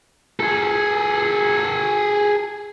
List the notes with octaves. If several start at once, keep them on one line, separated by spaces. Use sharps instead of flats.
G#4 A4